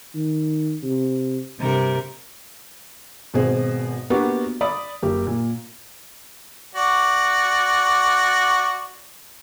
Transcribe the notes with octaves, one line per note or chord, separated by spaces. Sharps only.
D#3
C3
G2 C3 A#4
G#1 B2 G#4 C5
A#3 B3 D4 F#4 G4
D5 B5 D#6
F#1 G4
A#2
F#4 D5